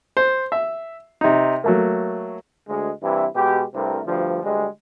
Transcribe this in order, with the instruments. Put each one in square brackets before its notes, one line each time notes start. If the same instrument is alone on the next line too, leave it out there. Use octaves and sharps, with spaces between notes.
[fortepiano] C5
E5
C3 D#4
F#3 A3 A#3
[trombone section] D2 G#3
G2 C3 E3 E4
B2 G#3 G4
C2 G2 C3 A3 A#4
D2 G2 F3
D2 G3 G#3